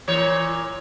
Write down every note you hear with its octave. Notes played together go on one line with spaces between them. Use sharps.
A#2 E3 C#5